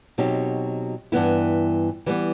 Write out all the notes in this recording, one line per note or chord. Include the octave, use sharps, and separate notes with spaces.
B2 F#3 C4 D#4 G4
G2 E3 B3 E4
E3 G3 B3